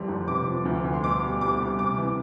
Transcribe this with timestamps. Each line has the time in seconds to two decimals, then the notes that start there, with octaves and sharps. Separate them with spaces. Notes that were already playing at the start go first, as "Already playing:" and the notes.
Already playing: A1 F2 E3 G3 C6
0.08 G1
0.27 C3 D6
0.47 F3
0.65 D2
0.84 D2
0.93 C6
1.04 B2 D6
1.22 G3
1.41 C2 D6
1.60 C2
1.78 C3 D6
1.98 E3